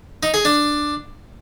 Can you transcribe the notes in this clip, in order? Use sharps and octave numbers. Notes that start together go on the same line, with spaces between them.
D#4
G#4
D4